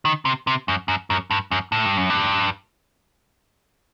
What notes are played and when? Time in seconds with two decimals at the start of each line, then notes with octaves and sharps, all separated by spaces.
0.05 D#3
0.25 C3
0.47 C3
0.68 F#2
0.88 F#2
1.10 F#2
1.31 G2
1.51 F#2
1.72 A2
1.85 G2
1.97 F#2
2.10 G2